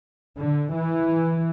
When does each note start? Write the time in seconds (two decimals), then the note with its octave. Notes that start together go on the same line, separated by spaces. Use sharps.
0.38 D3
0.73 E3